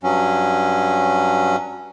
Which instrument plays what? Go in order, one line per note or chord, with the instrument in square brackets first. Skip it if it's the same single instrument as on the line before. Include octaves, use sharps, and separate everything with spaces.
[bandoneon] G2 F#3 C#4